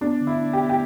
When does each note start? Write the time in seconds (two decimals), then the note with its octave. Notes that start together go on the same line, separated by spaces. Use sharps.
0.01 B3 D4
0.21 D3
0.27 E4
0.40 D4
0.53 G4
0.60 B3 E4
0.69 G4